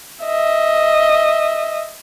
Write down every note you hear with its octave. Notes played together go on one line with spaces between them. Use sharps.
D#5 E5